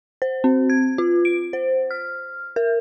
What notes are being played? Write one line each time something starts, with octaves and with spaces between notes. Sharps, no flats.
C5
C4
G#6
F4
D7
C5
F6
A#4